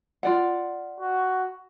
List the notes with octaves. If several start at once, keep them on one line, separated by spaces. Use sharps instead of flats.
F4 D5 F#5
F#4